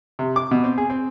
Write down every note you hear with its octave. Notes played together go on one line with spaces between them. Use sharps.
C3
D6
B2
C4
G#4
C4